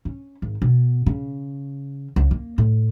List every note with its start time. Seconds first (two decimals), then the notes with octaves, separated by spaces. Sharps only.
0.05 C#4
0.42 G#1
0.62 B2
1.06 C#3
2.16 C#2
2.31 A#3
2.58 A2